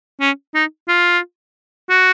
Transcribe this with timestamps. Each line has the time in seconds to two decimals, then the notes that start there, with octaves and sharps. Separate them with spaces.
0.20 C#4
0.54 D#4
0.88 F4
1.90 F#4